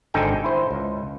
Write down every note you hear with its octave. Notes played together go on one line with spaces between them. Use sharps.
G#1 D3 D#4 A4 G5 G#5
E4 C5
C#2